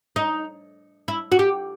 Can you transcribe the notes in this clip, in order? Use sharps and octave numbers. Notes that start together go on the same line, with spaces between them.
D#4
E4
F#4
G4